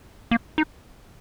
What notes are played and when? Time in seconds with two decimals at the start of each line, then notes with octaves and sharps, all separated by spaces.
0.31 A#3
0.58 D#4